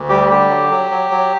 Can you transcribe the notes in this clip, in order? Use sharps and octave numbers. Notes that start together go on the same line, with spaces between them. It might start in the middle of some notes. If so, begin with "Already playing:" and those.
Already playing: D2
G3 G4
D3 G4
F#3
F#3
F#3
F#3